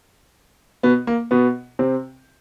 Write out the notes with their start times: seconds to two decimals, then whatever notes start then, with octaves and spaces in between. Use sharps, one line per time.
0.83 B2 B3
1.07 A#3
1.31 B2 B3
1.79 C3 C4